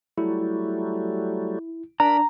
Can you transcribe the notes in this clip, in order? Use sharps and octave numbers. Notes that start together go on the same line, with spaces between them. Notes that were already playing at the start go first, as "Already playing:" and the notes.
F#3 G3 A3 E4
D4 A#4 A#5 B5